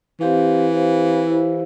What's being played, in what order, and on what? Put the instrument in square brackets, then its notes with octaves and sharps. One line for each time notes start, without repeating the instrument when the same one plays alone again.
[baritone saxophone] E3 [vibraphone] C4 G4 C5 F5
[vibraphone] C4 G4 C5 F5
E4 G4 C5 F5